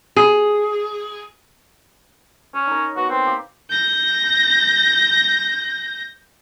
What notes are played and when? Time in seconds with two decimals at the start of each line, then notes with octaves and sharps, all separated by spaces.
0.16 G#4
2.54 C#4 C#5
2.67 D#4 A#4
2.96 B3 F#4
3.09 C4 B4
3.26 A#3 G4
3.70 G6 A#6